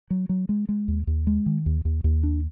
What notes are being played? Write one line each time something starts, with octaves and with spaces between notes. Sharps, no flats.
F#3
F#3
G#3
G#3
D#2
D#2
G#3
D#3
D#2
D#2
D#2
D4